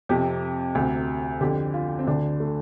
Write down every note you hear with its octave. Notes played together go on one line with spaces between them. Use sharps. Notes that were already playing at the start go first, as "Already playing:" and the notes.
F2 C3 G4
D2 C3
F2 D3 G4
F4
C4
D2 D3 D4
A3